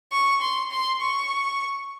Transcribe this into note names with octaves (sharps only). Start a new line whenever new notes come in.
C#6
C6
C6
C#6